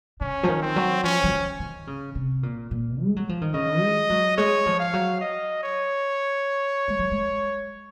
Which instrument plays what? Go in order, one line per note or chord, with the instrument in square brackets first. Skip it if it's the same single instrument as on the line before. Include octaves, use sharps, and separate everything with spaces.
[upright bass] C#3 [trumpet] C#4
[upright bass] F3
D#3
[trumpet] C4
[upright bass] F#3
[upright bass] F3 [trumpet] C#4
[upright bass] F3
D#3
D#3
C#3
C3
A#2
A#2
G#3
F#3
F3
D#3
[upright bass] C#3 [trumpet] D#5
[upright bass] G#3
F#3
[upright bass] G#3 [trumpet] C#5
[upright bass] F3
[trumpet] F5
[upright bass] F#3
[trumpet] D#5
C#5
[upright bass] G#3
F#3
G#3